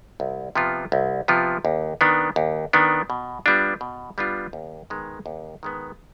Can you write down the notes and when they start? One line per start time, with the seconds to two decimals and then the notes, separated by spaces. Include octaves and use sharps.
0.20 C2
0.55 C3 F3 B3 F4
0.92 C2
1.28 C3 F3 B3 F4
1.65 D#2
2.01 D#3 B3 D4
2.36 D#2
2.73 D#3 B3 D4
3.10 B2
3.46 G3 B3 D4 F4
3.81 B2
4.18 G3 B3 D4 F4
4.53 D#2
4.90 D#3 G#3 B3
5.26 D#2
5.63 D#3 G#3 B3